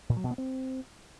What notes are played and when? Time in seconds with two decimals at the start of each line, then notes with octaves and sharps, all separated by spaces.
0.09 A#2
0.17 F#3
0.24 B2
0.31 B3
0.38 C4